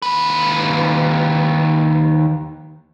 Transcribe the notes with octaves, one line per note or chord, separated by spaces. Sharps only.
D#2 B4